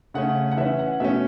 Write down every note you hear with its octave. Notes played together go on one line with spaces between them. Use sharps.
C#3 A3 C#4 F#5
F#5
E3 C#4 E5
F#5
B2 A3 C#4 E5